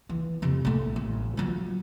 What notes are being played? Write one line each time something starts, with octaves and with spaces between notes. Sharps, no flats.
E3
F2 C3
A#1 A3
A1
F3 F#3